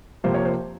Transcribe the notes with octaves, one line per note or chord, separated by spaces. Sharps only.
C3 F3 A#3 C5
C#5
C5